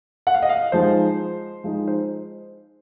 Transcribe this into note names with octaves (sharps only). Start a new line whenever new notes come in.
F#5
F5
D#5
F5
F3 G#3 D#4 C5
F3 G#3 D#4
C5